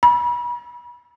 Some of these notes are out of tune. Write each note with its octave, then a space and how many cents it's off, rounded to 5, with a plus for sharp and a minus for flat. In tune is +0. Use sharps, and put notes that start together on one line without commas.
B5 -35